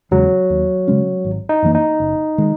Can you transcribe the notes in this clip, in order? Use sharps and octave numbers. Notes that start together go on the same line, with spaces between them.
E2 C#3 F#3 G#3
D#2
C#3 G#3 C#4
G#1
D#4
F#2 E3 A#3
D#4
F#1
D#3 G#3